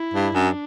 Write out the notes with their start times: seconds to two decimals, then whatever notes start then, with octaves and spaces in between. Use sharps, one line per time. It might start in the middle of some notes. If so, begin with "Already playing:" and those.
Already playing: E4
0.14 G2
0.34 F#2 D4